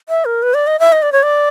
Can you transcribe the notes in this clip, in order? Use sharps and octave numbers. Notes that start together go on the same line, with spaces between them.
E5
A#4
B4
D5
D#5
E5
D#5
D5
C#5
D5